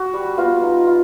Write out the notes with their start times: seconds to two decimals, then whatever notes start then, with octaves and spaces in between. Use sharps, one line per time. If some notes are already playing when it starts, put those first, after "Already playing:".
Already playing: F#4
0.13 G3
0.37 B3 F4
0.63 D#4
0.87 F4